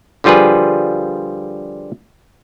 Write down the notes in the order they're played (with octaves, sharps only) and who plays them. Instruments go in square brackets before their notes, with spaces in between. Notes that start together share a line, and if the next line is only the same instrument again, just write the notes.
[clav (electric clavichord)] D3 F3 G3 F4 G#4 B4